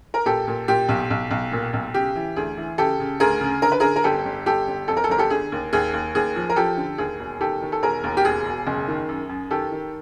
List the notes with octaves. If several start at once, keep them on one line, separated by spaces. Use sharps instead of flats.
A#4
A#2 G4 A4
A#2
A#2 G4
B1
B1
B1
A#2
B1
C#3 G4
E3
D2 G#4
E3
C#3 G4 A4
C#3
D2 G#4 A#4
C#3
D3 A#4
B4
D3 G#4 A#4
A#4
G1 G4 A4
G1
G1 G4 A4
G1
F2 A4
A#4
A4
G1 A#4
G4 A4
D3 G#4
D#2
D#2 G#4
D#2
D#2 G#4
F3
A#4
F3 G4 A4
D3
D#2 G#4
E1
D#3 G4 A4
D#3
A4
E1 G#4 A#4
D#2
G4
E1 G#4
E1
F#1
D#3
F#2
F#2
D#3 G4 A4
D#3